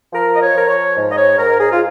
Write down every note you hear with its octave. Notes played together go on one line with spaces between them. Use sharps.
F3 A#4
D#5
C#5
F3 A#4
C#5
G#2
D#5
C#5
G#2 A#4
G#4
F4